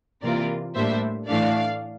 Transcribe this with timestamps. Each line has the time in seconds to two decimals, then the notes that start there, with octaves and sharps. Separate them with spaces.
0.23 C3 E3 A#3 F4 A#4 D5
0.75 A2 G3 A#3 D4 C5 E5
1.29 A2 E3 A3 D4 D5 F5